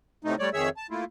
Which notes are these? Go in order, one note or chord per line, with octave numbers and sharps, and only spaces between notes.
A2 C3 A3 D#4
G3 A3 C#5 D5
F2 D#3 G#4 C#5 E5 E6
A5
A3 A#3 E4 F4